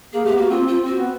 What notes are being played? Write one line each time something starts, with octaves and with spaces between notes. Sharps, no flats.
A#3 G#4
A3 G4
B3
A#3 F#4
C4 F4
C4
F4
C4
C4 F#4
B3